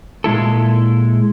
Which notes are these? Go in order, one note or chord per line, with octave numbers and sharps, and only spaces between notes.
A#2 G#3 E4 A4